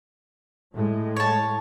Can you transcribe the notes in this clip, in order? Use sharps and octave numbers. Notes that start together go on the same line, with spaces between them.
A2 G#3
C#5 A5